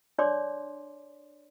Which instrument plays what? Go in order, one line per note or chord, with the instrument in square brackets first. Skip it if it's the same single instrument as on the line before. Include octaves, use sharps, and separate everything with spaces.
[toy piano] D4 C#5 D5 C6 D6